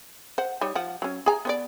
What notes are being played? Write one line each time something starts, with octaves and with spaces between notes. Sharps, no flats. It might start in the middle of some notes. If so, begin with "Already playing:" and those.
C5 F#5
G3 D#4 C#5
F3 F#5
F#3 C#4
G#4 G#5 A#5
B3 C#5 D5